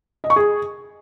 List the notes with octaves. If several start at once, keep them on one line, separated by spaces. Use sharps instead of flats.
D#5
C#6
G#4